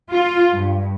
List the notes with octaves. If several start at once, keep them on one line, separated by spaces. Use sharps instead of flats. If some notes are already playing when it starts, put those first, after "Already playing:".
F4
G2